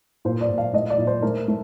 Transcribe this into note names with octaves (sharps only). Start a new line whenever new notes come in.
A#2 C5
D5
A#2
F5
A3 D#5
D5
A#2
C5
A3 A#4
A3